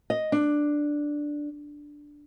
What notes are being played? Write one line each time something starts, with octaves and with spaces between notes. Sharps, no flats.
D#5
D4